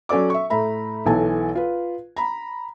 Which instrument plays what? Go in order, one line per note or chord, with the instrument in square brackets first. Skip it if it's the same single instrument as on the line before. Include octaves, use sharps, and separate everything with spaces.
[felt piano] F#3 C#4 A4 D5 D6
E5 C#6
A2 A3 E5 A#5 B5
B1 E3 A4 G#5 A5
F4 B4
A#5 B5